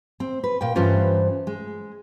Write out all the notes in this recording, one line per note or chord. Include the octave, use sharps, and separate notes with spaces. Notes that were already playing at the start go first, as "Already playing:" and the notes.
C4
B4
A#2 G5
G2 E3 C#4 F4 C5
G#3